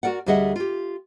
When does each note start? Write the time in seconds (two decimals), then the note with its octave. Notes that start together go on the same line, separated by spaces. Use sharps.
0.03 F#4 G4 A#4 D5 F#5
0.26 D2 G3 G#4 D#5 E5 F#5
0.56 F4 G4